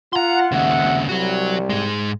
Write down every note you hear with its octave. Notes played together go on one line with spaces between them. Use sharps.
F4 F#5 A#5 C6
G#1 D#2 C#3 E5 F#5
C2 F#3 G3 F#4
G#2 G#3